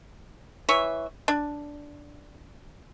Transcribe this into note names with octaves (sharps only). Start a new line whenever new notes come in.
E3 C#5 E5
D4